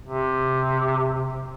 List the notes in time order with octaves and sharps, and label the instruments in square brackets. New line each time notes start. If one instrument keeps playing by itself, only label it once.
[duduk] C3